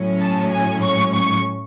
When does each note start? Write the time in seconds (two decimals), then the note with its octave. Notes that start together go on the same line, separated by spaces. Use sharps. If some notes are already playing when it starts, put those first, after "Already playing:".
Already playing: A2 F#3 C#4
0.21 A5
0.52 G#5
0.83 C#6
1.15 C#6